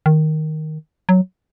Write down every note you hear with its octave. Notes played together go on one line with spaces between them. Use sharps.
D#3
F#3